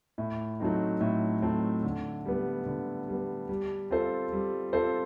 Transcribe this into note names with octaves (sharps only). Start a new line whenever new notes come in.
A2
F#3 A3 C4 D#4
A2
F#3 A3 C4 D#4
D3
G3 B3
D3
G3 B3
G3
C4 F4 A4 C5
G3
C4 F4 A4 C5